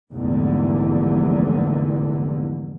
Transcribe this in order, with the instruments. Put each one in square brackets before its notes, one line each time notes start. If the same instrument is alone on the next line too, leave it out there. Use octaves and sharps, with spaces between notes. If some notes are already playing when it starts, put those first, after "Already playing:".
[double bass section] F1 A#1 E2 G#2 D3